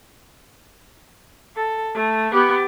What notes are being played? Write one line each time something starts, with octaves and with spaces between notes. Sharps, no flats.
A4
A3
B3 G4